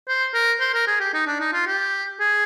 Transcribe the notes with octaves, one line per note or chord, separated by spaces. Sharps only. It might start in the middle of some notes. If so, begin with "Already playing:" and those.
C5
A#4
C5
A#4
G#4
G4
D#4
D4
D#4
F4
G4
G#4